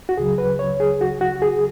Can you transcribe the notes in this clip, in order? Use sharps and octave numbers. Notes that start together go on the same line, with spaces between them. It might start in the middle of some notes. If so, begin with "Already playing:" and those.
F#4
C#2 C#3 F#3 G#4
B4
C#5
G#4
F#4
F#4
G#4